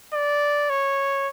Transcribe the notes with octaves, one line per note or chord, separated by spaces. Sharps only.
D5
C#5